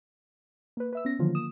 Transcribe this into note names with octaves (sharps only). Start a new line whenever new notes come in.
A#3 B4
B4 E5 E6
B3 C#4 A#6
D3 D#3 F3 F#3 A#3 F4
A#3 D#6 E7